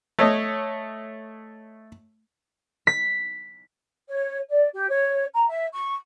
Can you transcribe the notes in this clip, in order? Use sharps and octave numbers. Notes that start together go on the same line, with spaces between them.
A3 C#5 D#5
B6
C#5
D5
G4
C#5
A#5
E5
C#6